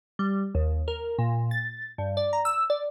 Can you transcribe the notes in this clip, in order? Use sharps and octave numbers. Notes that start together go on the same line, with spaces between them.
G3
D#2
A#4
A#2
A6
G2
D5
A#5
E6
D5